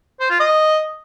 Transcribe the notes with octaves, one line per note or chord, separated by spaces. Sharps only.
C5
F4
D#5